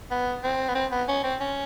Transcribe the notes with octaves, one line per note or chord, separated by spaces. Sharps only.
B3
C4
B3
C4
B3
C#4
C4
C#4